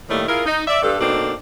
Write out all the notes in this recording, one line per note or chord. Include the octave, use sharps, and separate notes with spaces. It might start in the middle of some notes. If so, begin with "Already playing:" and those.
A2 D#3 G3 A3 A#3
E4 F4 G#4 A#4
D#4
D5 E5
G2 A4
B2 A#3 C4 D4 D#4 A4